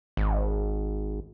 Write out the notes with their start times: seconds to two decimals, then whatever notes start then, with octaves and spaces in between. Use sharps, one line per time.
0.17 G#1